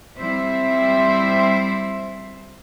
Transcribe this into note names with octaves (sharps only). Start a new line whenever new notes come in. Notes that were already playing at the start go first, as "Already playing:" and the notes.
G3 C4 E4 C5 E5